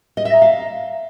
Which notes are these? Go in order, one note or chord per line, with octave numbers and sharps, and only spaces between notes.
D#5
E5
A#5
F5